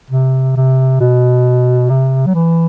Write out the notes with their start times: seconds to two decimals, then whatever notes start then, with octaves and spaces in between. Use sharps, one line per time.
0.10 C3
0.56 C3
1.01 B2
1.90 C3
2.27 F#3
2.35 E3